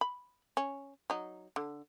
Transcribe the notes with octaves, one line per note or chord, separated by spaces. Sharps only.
B5
C#4
F#3 D#4
D3